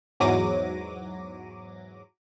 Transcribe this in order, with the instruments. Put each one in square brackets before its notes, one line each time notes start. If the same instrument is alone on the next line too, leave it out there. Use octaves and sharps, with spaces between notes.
[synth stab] E2 G#2 F#3 D6 A#6 D#7